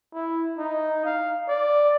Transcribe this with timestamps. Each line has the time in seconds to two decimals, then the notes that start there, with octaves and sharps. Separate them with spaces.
0.14 E4
0.58 D#4
1.04 F5
1.48 D5